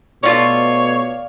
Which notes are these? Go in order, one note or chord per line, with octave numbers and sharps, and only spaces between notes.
B2 A3 F4 C#5 D5 F5 C#6